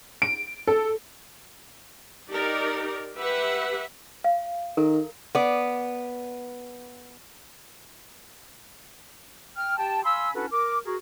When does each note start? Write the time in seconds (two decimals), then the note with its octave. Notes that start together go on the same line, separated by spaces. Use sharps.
0.22 D7
0.67 A4
2.31 D#4 G4 A#4 D5
3.17 G4 B4 E5 F#5
4.24 F5
4.77 D#3 A4 A#4 A#5
5.35 B3 D5
9.57 G5 F6
9.78 G4 G5 A5
10.04 F5 G#5 B5 C6 E6
10.35 C#4 D4 E4 F#4 A4 B4
10.52 A#4 D6
10.86 F#4 G#4 A#4